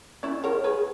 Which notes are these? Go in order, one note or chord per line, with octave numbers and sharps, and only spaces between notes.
C#4 E4
A#4 C#5
G#4 B4